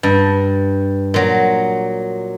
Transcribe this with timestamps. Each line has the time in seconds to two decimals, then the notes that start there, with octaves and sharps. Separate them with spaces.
0.03 G2
1.14 A#2 F#3